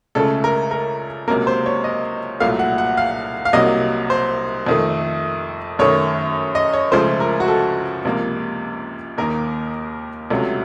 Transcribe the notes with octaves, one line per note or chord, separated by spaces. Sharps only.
C#2 C#3 A3 A4
A#4
A#4
C#2 C3 F#3 A#3 A#4
C5
C#5
D#5
C2 A#2 F#3 A3 F5
F#5
F#5
F5
F5
C2 C3 F#3 A#3 D#5
C5
F2 D#3 A3
F#2 D#3 A3 C#5
D#5
C#5
C#2 C#3 F3 A3 C5
A#4
F#4
A4
C#2 C3 F3 A#3
D#2 D#3 A#3 A#4
C#2 C3 F#3 A3